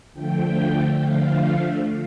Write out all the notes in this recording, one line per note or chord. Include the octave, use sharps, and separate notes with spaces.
D3 F3 A3 G5
D3 F3 A3 F5